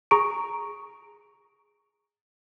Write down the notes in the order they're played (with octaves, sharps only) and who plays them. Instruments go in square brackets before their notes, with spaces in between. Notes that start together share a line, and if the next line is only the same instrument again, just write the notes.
[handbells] G#4 A#5 C#6 D7